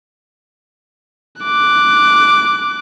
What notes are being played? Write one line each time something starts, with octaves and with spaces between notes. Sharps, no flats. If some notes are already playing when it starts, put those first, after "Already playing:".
D6 F#6